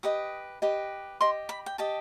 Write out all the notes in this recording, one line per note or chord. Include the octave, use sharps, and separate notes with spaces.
G4 B4 D#5 D#6
G4 B4 D#5
G4 D#5 C6
B5
G5
G4 D#5 A5